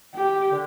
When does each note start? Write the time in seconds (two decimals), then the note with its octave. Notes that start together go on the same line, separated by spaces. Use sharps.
0.15 G4
0.50 D3